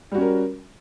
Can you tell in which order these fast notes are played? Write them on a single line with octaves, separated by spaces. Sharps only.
G3 F#4 C#4 A#4